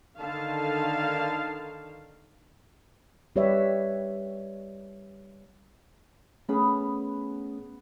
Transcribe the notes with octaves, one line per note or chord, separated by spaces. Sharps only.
D3 D#3 F5 A5
G3 G4 B4 C#5 D5 E5
A3 B3 C#4 G#4 B5